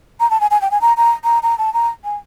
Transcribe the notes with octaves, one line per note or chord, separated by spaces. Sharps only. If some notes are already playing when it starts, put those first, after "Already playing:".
A#5
A5
G#5
G#5
G5
G#5
A#5
A#5
A#5
A#5
A5
A#5
G#5